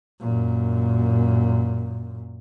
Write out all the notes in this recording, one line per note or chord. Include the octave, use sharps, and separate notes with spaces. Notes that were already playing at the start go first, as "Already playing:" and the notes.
F#2 A#2